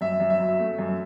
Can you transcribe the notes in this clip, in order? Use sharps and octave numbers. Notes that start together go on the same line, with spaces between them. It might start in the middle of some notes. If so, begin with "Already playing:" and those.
F#2 E5
F#2
E5
F#3
A3
F#2